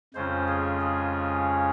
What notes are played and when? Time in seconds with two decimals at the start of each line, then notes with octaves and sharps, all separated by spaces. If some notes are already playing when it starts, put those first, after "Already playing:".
0.14 F2 C#3 G#3 C#4 F4 C5
0.48 G#4
0.81 G#4